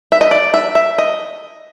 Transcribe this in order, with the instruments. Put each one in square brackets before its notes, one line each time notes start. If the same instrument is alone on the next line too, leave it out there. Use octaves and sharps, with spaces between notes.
[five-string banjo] E5
D#5
D5
E5
E5
D#5